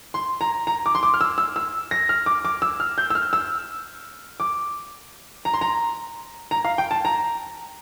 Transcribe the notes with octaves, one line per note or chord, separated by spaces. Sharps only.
C6
A#5
A#5
D6
C6
D6
F6
E6
E6
E6
A#6
F6
D6
D6
E6
F6
G6
E6
F6
E6
D6
A#5
C6
A#5
A#5
F5
G5
A5
A#5